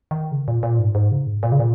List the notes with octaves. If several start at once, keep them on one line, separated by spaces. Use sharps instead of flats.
D#3
C#3
A#2
A#2
G#2
G#2
C#3
G#2
A#2
C#3
A#2